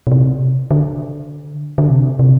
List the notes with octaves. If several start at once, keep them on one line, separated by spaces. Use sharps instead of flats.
B2
C3
D3
D3
C3
C3